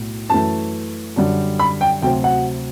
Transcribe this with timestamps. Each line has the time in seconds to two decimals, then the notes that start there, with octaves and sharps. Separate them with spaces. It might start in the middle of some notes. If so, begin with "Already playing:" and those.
Already playing: B1 A2
0.30 F#2 E3 A3 A5
1.16 F#2 D3 G3
1.59 B5
1.81 G5
2.02 D2 C3 F#3 C4 G5
2.24 F#5